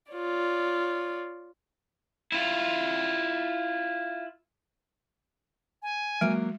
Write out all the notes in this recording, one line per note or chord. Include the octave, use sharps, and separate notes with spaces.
F4 C#5 D5
E4 F4
G#5
F#3 G#3 A#3